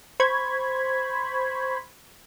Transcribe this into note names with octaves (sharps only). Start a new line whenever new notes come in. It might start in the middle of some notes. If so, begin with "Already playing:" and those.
C5 B5 C#6 G#6